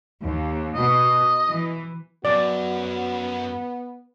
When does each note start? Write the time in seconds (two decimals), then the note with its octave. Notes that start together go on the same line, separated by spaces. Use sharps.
0.21 D#2
0.75 B2 D#5
1.49 E3
2.25 F#2 B3 F#4 D5